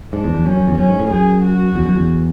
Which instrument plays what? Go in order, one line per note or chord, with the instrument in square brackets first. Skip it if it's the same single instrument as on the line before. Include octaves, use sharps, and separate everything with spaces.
[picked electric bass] G#2 [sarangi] D4
[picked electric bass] E2
E2
[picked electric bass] F#2 [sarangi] C#4
[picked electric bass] F#2
E2
[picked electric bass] F#2 [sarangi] C#4
[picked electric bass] G#2
A2
[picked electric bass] F#2 [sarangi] G#4
[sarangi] F#4
[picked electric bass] E2
F#2
E2